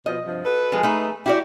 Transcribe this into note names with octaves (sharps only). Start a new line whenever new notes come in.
B2 F3 D#5
G2 C3 F3
F#4 A4 B4
F3 G#3 G#4
A3 D#4 G#4 B4
E4 F#4 G4 D5